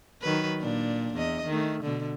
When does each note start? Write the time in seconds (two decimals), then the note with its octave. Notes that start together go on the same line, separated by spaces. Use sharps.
0.22 D#3 F#3 B4
0.59 A#2 D4
1.14 E2 D#5
1.47 D#3 A3
1.83 B2 D3